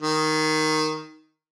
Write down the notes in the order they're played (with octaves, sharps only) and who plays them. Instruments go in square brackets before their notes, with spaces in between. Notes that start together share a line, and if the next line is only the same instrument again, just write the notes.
[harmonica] D#3